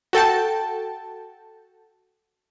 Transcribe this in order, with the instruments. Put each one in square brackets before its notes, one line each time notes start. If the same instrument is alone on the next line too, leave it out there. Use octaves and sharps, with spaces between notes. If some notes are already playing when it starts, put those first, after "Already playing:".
[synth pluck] F#4 A4 G5 A5